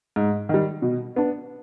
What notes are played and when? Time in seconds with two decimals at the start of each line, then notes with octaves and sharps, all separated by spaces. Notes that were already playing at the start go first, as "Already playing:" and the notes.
0.16 G#2
0.49 D#3 G3
0.82 B2
1.16 B3 D4